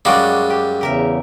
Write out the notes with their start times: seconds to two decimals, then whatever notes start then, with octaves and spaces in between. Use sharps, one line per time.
0.05 F#2 G3 G#3 F#4 G#4 D5 F5 D6
0.50 G4
0.81 E2 C#3 G4 A#4 E5